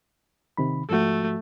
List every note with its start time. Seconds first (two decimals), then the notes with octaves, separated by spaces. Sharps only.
0.57 C3 D#3 B5
0.90 G#2 F3 A3 F#4